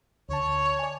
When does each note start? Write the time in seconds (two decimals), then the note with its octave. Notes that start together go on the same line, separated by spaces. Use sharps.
0.29 D2 D3 C#5 A5
0.79 D5 G#5